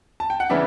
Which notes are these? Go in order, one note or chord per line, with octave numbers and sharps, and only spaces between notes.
A5
G5
F#5
C#3 E3 B3 D4 E5